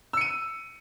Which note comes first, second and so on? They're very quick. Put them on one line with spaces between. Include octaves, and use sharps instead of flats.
E6 C#7 D#7